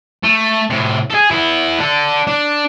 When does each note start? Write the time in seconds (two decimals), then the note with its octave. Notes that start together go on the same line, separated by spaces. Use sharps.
0.23 A3
0.70 A2 C3
1.10 G#4 A4
1.31 B3 E4
1.79 D4 A4
2.27 D4